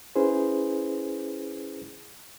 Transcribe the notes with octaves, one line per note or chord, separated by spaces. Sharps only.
C#4 E4 G#4 B4 C5